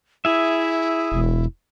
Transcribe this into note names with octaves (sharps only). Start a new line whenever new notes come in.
E4 G#4 E5
E1